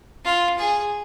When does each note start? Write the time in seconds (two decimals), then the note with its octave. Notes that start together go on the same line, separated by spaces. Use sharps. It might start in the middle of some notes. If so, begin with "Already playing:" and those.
0.25 F4
0.58 G#4